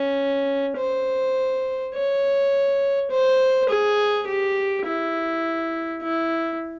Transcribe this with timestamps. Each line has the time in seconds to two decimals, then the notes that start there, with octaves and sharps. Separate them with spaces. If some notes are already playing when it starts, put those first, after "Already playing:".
Already playing: C#4
0.77 C5
1.94 C#5
3.11 C5
3.69 G#4
4.27 G4
4.86 E4
6.02 E4